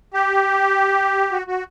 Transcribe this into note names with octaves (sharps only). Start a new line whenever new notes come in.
G4
F#4
F#4